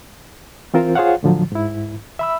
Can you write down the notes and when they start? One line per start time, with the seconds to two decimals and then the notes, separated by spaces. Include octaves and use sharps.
0.74 E3 C4 F4 A#4 C5
0.95 F4 G#4 C5 C#5 F5 F#5
1.23 A2 D3 F3 F#3
1.52 G#2 E4
2.19 E5 B5 E6